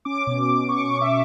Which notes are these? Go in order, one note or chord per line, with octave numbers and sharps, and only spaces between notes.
C#4 D6
B2
B2
B2 C#6
C#6
B2
E5